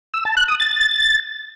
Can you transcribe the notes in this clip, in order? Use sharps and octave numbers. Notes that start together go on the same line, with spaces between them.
E6
A5
F#6
D#6
A6